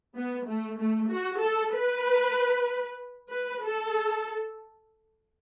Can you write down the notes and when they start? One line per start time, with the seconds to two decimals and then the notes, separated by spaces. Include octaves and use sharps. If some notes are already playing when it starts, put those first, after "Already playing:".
0.15 B3
0.46 A3
0.78 A3
1.10 F#4
1.41 A4
1.73 B4
3.30 B4
3.62 A4